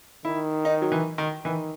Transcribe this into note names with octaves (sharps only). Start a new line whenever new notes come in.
D#3 E4
D#4
F#3
E3
D#3
D#3 E3